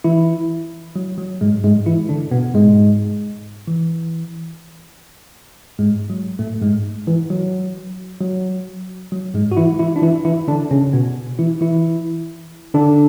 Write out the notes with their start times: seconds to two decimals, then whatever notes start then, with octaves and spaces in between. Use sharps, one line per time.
0.04 E3 E4
0.96 F#3
1.18 F#3
1.41 G#2 G#3
1.64 G#2 G#3
1.86 E3 E4
2.09 D3 D4
2.31 B2 B3
2.54 G#2 G#3
3.68 E3
5.79 G#2 G#3
6.10 F#3
6.39 A2 A3
6.62 G#2 G#3
7.07 E3
7.30 F#3
8.21 F#3
9.12 F#3
9.34 G#2 G#3
9.52 F#4
9.57 E3 E4
9.79 E3 E4
9.96 D4
10.02 E3 E4
10.25 E3 E4
10.48 D3 D4
10.71 C#3 C#4
10.93 B2 B3
11.39 E3 E4
11.61 E3 E4
12.74 D3 D4